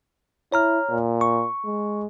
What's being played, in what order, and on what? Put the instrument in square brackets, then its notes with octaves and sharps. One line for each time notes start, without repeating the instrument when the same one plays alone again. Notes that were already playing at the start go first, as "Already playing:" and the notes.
[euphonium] E4 [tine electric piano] C#5 A#5 F6
[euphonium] A#2
[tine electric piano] C#6
[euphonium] G#3